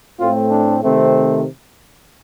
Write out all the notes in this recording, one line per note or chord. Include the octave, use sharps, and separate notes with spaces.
A2 A3 C4 F4
D4
C3 D#3 A3 C4